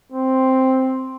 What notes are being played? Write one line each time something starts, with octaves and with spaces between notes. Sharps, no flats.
C4